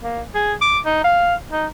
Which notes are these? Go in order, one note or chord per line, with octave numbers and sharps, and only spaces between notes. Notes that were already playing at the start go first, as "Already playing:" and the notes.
A#3
G#4
D6
D#4
F5
D#4